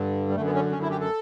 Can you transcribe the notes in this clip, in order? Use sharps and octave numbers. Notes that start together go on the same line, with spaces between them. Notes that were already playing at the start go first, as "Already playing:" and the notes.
Already playing: G2 D3
G3
F#2 D3 A3
B3
C#4
C#4
E4
G4
A4